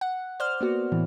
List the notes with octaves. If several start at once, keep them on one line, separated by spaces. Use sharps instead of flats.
F#5
C5 D5 F6
A#3 B3 F#4
A2 E3